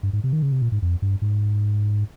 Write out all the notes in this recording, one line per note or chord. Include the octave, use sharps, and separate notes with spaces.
G2
G#2
C3
D#3
C#3
C3
A#2
G#2
F2
G2
G#2